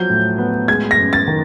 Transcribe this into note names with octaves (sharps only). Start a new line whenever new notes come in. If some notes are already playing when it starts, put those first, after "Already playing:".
Already playing: F3 F#3 G6
A2
B3
G#3 G#6
A#6
F#2
A6
D#3